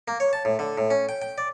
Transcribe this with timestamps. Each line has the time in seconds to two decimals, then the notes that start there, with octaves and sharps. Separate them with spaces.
0.08 A#3
0.20 C#5
0.33 A5
0.45 A2
0.59 D3
0.78 A2
0.90 C#4
1.09 G5
1.22 G5
1.38 D5